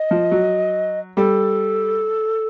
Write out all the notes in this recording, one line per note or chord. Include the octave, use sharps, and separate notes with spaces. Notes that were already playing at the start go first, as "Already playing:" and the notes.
Already playing: D#5
F3
F#3
G3 A4